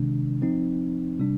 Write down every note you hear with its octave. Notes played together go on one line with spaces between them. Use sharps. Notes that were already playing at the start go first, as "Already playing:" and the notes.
Already playing: C3 D#3 G#3 D4
F3 C4 D#4
C3 G3 D4